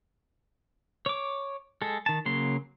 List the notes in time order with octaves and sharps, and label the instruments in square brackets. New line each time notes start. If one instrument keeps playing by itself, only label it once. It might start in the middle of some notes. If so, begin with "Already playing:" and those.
[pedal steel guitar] C#5 D6
G#3 A4
D#3 A5
C#3 F#3 A#3 C6